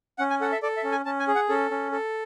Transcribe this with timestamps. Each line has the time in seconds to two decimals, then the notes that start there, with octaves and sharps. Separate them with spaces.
0.18 C#4 F#5
0.30 G#5
0.41 A4 F#5
0.52 E5
0.63 A4 D5
0.77 E5
0.84 C#4
0.92 G#5
1.06 C#4 A5
1.20 G#5
1.28 G#4
1.35 F#5
1.49 C#4 A4
1.71 C#4
1.92 A4